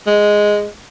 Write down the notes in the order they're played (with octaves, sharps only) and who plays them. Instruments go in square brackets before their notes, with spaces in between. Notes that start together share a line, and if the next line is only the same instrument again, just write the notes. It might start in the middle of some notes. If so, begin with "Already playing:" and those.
[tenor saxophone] G#3